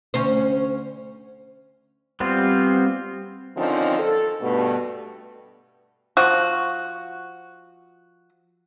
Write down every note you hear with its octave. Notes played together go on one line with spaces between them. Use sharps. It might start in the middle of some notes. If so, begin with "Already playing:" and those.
D2 C#4 C5
G3 B3 C4 F4
D3 D#3 F3 C4 C#4 D#4
A4
G2 B2 A3
F3 F#4